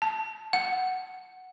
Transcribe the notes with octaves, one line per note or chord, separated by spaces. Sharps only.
A5
F#5